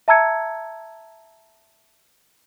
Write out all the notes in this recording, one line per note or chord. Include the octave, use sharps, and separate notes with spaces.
E5 A5 A#5 E6 G#6 C#7